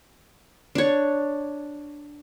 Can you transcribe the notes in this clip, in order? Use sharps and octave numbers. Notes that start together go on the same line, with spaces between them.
D4 C#5